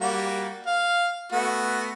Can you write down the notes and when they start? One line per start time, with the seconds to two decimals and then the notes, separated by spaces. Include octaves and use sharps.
0.01 G3 A#3 F#4
0.66 F5
1.32 A3 B3 F#4